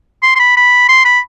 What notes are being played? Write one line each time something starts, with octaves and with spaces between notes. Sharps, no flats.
C6
C6
B5
B5
C6
B5